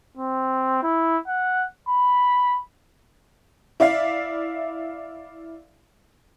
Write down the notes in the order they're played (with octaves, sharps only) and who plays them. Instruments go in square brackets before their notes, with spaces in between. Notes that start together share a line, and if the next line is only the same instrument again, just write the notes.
[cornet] C4
E4
F#5
B5
[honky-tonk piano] E4 D5 E5 F5